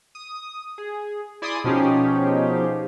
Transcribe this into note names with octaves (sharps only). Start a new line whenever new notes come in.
D#6
G#4
E4 D5 G#5 C6 D#6
B2 F3 C#4 D#4 G4 G#4